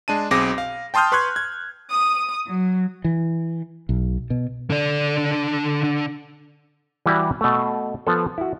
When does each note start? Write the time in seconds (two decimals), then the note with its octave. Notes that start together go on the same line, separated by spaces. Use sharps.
0.08 G#3 D4 A5 D#7
0.31 B1 C4 G#4 D6 A#6
0.58 F5
0.94 G5 A5 C6 D#6 F6 G6
1.12 B4 C6 C#6 F#6 G#6
1.36 G#6
1.91 D#6
2.46 F#3
3.04 E3
3.89 B1
4.30 B2
4.70 D3 D4
7.06 E3 G3 E4 F#4 G4 D5
7.41 B2 A3
8.07 F3 B3 A4
8.38 E4 F#4